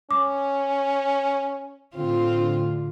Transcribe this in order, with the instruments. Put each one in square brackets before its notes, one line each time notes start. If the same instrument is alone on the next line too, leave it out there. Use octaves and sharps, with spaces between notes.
[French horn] C#4 [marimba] D6
[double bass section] A2 D3 [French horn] C4 [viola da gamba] F4